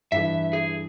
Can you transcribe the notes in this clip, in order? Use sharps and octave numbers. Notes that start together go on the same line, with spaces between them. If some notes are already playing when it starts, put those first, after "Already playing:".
G2 E3 E5
G#4